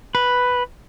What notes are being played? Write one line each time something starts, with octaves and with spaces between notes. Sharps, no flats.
B4